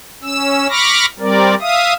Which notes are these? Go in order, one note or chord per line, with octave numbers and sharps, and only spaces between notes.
C#4 E6
B5 C#6 D6 F6 A#6
G3 C4 A#4 D5
E5 F5 D#6